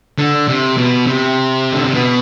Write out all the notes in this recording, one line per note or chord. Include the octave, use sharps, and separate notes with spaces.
D3
C3
B2
C3
D3
C3
B2